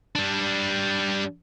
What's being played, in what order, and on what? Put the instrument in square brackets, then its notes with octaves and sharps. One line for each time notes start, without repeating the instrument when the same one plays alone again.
[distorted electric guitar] G3 D4